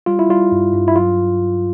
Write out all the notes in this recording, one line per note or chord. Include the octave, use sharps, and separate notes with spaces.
G3 F4
E4
G3 F4
G2
G2
E4
F#3 F4